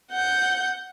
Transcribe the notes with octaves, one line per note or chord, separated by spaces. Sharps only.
F#5 G6